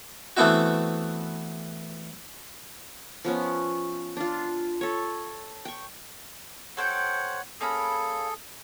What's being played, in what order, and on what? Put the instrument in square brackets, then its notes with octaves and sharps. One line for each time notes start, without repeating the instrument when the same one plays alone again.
[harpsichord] E3 A3 B3 C4 E4 F#4
[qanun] F3 B3 C#4
D4 F4
A4 C#5
G5 C#6
[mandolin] A4 C5 G5 [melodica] C#5 F#5
[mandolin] A#3 C#4 B5 [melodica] G#4 A4